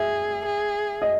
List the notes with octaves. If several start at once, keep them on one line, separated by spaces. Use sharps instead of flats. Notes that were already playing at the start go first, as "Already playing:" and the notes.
Already playing: G#4 E5
G#4
D#5